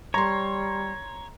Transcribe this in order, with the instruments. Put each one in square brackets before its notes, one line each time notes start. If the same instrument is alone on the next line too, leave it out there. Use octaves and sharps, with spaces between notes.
[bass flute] G3 [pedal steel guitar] C#5 [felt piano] A#5 C6